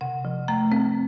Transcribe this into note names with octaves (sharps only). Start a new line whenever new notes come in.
C3 F#5
F3
A3 A#5
C4